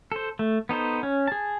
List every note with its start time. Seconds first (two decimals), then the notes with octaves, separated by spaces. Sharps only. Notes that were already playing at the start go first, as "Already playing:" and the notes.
0.12 A4 C5
0.39 A3
0.69 B3 D#4 A4 C5
1.03 C#4
1.28 G#4 A5